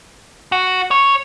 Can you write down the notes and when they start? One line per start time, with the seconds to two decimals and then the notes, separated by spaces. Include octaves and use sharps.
0.52 F#4
0.91 C#5